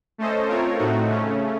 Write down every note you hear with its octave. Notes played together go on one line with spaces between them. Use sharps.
A3 C#4 A4 C5 D#5
A3 C4 F4 A#4 C#5
A2 A3 C4 D#4 F#4
C#3 A3 C#4